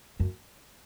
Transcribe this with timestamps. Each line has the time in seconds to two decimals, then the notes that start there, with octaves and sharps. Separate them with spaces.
0.20 F#2